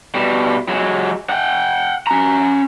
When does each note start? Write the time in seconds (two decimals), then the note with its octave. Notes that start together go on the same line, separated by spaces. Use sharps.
0.15 B2 G3
0.68 F#3 G#3
1.29 F#5 G5
2.07 C#4 A#5